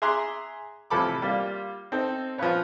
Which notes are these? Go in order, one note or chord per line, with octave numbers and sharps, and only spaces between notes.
G#4 E5 A#5 C6 D6 F#6
A1 C3 F3 A4 B5 D6
G3 A#3 F4
C4 D#4 A4
F3 B3 C#4 F4 B4 C#5